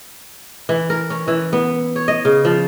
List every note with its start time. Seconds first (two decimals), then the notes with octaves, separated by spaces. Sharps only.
0.69 E3
0.90 A#4
1.10 C#4
1.28 E3
1.53 B3
1.96 C#5
2.08 D#5
2.25 C#3
2.45 F3